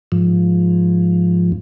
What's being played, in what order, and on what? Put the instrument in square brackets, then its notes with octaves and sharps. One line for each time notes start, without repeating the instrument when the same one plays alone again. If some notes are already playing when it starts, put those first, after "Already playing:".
[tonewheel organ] G#2 F3